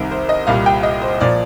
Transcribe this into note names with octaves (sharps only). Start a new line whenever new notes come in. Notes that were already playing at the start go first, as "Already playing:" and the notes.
Already playing: C2 C3 D#3 A#4
C5
D#5
C2 A#2 G3 F5
G5
D#5
C5
A#2 F3 D5